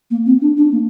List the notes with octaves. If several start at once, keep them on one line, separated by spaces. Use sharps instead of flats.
A#3
C4
D4
D4
A#3